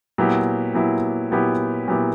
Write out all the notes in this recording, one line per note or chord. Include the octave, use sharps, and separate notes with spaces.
A#2 F#3 B3 E4 G4
A#2 F#3 B3 E4 G4
A#2 F#3 B3 E4 G4
A#2 F#3 B3 E4 G4